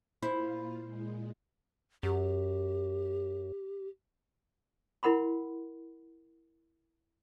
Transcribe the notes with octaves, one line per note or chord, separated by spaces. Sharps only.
A#2 A#3 E4 F4 C5
A#2 G#3
F#2 G4
E4 A#4 F#5 B5 C6